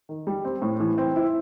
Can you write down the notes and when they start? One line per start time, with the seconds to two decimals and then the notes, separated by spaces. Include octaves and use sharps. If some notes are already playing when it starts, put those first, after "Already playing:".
0.09 D#3
0.27 G3
0.45 C4
0.62 A2
0.80 E3
0.98 C4
1.16 E4